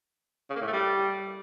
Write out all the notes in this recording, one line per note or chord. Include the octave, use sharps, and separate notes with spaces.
C#3
A#3
A2
A3
G3